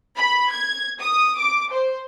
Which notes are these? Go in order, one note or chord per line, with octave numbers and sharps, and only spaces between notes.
B5
G#6
D#6
D6
C5